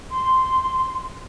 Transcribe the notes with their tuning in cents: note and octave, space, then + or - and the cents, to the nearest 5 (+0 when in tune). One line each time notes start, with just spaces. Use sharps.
C6 -5